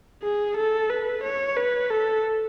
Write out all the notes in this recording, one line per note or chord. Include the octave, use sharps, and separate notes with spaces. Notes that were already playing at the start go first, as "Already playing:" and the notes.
G#4
A4
B4
C#5
B4
A4